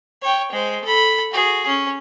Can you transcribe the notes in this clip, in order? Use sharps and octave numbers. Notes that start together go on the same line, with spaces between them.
C#5 G5
G#3 C5
A4 B5
F#4 G#4
C#4